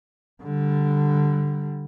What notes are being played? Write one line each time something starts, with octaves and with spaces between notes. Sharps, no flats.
D3 G3